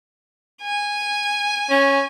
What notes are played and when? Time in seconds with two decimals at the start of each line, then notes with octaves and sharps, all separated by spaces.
0.62 G#5
1.70 C#4